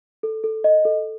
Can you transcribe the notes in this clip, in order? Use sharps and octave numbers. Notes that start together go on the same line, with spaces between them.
A4
A4
D#5
A4